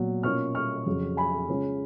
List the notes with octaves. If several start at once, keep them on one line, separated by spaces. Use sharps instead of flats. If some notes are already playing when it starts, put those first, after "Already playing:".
Already playing: A#2 F#3 B3
B2 A#3 C#4 F4 C#6 F6
C#6 F6
F2 C#3 F#3
G#5 B5
C#3 G#3 C#4 F4